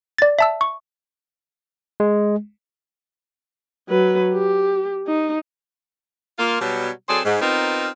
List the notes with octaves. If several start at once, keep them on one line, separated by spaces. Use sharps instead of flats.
D5 A6
E5 A5 E6
C#6
G#3
F#3 B4
G4
D#4
A#3 F4
B2 F#3 G3
F#3 C4 G#4 A4 C5 D5
G#2
B3 C4 D#4 F4 A#4